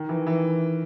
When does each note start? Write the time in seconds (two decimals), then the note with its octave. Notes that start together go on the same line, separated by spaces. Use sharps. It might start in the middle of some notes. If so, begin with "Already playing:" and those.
Already playing: D#3
0.09 E3
0.27 E3